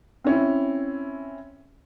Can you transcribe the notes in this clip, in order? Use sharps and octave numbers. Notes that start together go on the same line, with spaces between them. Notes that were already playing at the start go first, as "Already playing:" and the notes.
C4 C#4 E4